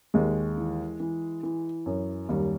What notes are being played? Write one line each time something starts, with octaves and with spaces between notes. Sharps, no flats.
D#2 G#3
E3
E3
E3
F#2
D#2 G3